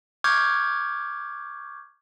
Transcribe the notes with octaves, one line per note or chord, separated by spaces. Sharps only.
C#6 D6 F6 G6 G#6